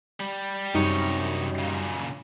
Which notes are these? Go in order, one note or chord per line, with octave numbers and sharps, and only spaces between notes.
G3
F#2 C3 G3 D#4 C#5
A#2 C#3